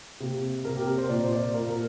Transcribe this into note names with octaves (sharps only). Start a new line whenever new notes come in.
C3 A#3 G4
C3 A#3 A#4
G4
A#4
C5
A#2 A#3 D5
C5
D5
A#2 A#3 A#4
A#4